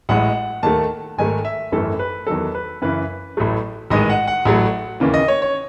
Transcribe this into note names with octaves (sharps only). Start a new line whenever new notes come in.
A1 A2 G#3 F#5
D#2 D#3 A3 A5
G#1 G#2 D#3 A3 G#5
E5
G#1 F#2 E3 A3 A4
B4
E2 D#3 F#3 A4
B4
F#2 C#3 E3 B4
A1 A2 F#3 A3
A1 G#2 D#3 G#3 D#5
F#5
F#5
A1 A2 F#3 A3
D#2 C#3 E3
D#5
C#5
C#5